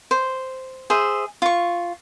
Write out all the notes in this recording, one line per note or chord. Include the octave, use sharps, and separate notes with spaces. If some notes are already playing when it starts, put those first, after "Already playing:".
C5
G#4 C5 E5
F4 C#6